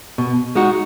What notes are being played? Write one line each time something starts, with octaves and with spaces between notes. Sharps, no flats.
B2
G#3 D#4 F#4